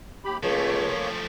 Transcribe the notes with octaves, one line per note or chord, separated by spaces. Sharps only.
D#2 G4 B5
C#2 F3 A3 A#3 C#5